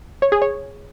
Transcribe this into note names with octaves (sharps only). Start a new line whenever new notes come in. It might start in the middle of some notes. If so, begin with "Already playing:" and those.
C#5
G#4
C#5